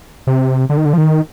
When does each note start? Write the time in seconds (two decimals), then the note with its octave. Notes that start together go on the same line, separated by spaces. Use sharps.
0.27 C3
0.69 D3
0.77 D#3
0.85 D3
0.93 F3
0.98 D#3